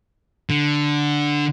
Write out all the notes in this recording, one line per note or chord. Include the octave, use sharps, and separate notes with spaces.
D3